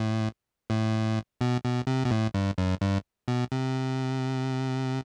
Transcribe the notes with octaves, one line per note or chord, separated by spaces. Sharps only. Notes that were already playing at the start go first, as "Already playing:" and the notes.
Already playing: A2
A2
B2
B2
C3
B2
A2
G2
F#2
G2
B2
C3